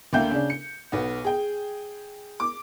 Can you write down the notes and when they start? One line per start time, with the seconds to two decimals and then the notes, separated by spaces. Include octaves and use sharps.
0.13 D2 D3 A#3 E5 G5 G6
0.31 C#3 D4
0.50 C#7
0.92 B1 B3
1.25 G#4 G5
2.40 D6